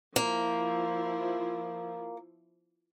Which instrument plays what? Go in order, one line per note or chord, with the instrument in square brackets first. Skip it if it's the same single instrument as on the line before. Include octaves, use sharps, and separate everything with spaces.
[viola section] F3 E4 [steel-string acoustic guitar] A#3